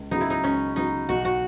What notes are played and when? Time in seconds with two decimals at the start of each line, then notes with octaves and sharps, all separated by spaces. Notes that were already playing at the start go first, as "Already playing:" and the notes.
Already playing: C#2
0.11 C#3 F#3 B3 D#4
0.21 E4
0.30 D#4
0.44 C#2 C#4
0.76 C#3 F#3 B3 D#4
1.09 B1 F#4
1.25 F#4